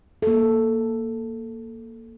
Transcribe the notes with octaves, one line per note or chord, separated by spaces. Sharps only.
A#3 A4